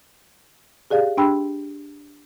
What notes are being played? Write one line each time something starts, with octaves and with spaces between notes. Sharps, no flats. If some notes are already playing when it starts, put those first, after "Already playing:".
G4 G#4 D5 F5
D4 G4 G5 B5 C6 E6